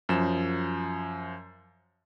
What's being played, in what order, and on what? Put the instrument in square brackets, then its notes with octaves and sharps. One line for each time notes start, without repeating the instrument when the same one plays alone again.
[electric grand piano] F#2 F3 E7